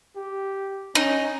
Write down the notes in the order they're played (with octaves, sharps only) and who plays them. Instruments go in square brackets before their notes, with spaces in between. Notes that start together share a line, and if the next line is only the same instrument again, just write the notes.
[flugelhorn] G4
[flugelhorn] C#4 [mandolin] D#4